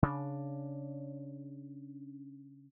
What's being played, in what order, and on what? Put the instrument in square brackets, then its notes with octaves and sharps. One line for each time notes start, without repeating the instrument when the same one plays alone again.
[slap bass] C#3 D4